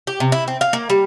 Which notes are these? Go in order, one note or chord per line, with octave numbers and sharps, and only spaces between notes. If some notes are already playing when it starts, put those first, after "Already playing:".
G4
C3
E4
C4
F5
A#3
G3